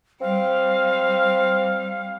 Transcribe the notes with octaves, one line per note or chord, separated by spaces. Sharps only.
G3 C4 F5